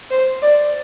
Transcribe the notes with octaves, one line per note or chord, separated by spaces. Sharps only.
C5
D5